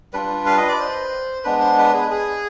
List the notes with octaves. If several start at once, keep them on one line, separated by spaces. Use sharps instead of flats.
G3 D4 F4 B4
F5
D#5
D5
C5
G#3 B3 D4 B4
C5
B4
G#4
G#4